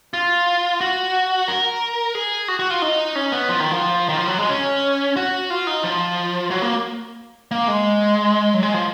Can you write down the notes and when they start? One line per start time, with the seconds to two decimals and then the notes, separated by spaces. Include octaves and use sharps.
0.14 F4
0.81 F#4
1.48 A#4
2.15 G#4
2.48 F#4
2.59 F#4
2.70 F4
2.82 D#4
3.15 C#4
3.32 B3
3.49 F3
3.60 D#3
3.71 F3
4.09 D#3
4.16 F3
4.27 F#3
4.38 G#3
4.49 C#4
5.17 F#4
5.50 F4
5.67 D#4
5.84 F3
6.51 F#3
6.62 A#3
7.51 A#3
7.68 G#3
8.54 F#3
8.63 G#3
8.74 F3